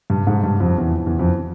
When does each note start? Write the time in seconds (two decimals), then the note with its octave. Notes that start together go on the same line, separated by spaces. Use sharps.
0.10 G2
0.27 G#2
0.43 G2
0.60 F2
0.78 E2
1.07 E2
1.19 F2